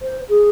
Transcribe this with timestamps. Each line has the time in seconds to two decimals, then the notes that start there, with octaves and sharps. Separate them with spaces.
0.02 C5
0.29 G#4